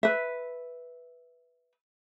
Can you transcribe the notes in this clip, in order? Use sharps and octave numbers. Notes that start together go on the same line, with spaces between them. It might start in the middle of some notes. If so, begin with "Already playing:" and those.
B4 E5